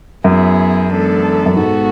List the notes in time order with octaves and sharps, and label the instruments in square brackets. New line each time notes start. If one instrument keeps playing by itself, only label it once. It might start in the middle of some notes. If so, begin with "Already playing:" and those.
[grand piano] F#2 [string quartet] F#3 B3 E4 G#4
[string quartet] E3 G#3 B3 D4 A4
[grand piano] F#2
[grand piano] G#2 [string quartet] B2 G#3 B3 F#4 A4